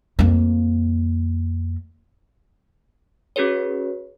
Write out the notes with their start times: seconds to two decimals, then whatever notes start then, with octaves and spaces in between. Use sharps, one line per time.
0.19 F2 A#3
3.36 C#4 F#4 G#4 B4 C#5